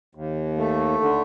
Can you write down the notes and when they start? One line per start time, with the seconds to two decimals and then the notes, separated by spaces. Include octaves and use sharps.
0.15 D#2
0.58 A3
1.00 D3